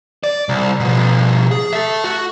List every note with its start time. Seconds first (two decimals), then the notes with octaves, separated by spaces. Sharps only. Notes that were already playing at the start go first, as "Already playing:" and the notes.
0.24 D5
0.49 C2
0.80 B2 F3
1.51 G#4
1.73 A4 E5
2.04 F#4